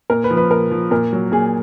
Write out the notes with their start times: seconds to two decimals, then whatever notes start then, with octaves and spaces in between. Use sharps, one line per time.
0.10 A#2 A#4
0.24 B4
0.31 F3
0.37 B4
0.51 A#2 A#4
0.71 F3
0.91 A#2 A#4
1.13 F#3
1.32 A#2 G#4